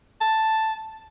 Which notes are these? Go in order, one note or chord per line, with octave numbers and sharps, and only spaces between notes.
A5